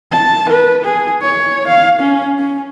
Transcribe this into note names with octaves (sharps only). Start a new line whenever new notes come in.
A5
B4
G#4
C#5
F5
C#4
C#4